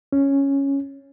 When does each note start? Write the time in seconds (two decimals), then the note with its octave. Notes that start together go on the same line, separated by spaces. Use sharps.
0.12 C#4